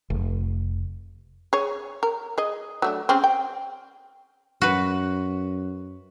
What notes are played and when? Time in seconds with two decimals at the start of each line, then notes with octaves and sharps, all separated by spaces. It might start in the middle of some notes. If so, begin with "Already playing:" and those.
0.10 F1
1.53 G#4 C#5
2.03 A#4
2.38 G#4 D#5
2.82 F#3 A3 D4
3.09 C4 C#4 G#4
3.24 G5
4.62 F#2 F#4 B4